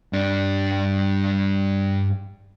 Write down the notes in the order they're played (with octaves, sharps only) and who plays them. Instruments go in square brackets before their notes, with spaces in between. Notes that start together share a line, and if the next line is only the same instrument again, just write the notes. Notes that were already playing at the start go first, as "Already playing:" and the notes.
[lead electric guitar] G2 D4